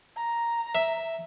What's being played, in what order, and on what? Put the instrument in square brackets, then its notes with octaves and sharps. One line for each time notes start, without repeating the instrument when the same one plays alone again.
[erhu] A#5
[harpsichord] E5